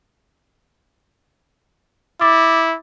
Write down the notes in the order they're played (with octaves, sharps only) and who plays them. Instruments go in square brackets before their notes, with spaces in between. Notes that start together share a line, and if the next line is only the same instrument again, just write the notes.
[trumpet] E4 [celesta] D6 A6